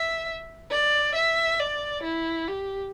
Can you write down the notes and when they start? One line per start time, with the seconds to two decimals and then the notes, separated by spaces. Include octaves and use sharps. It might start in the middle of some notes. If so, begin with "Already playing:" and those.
Already playing: E5
0.71 D5
1.15 E5
1.59 D5
2.03 E4
2.48 G4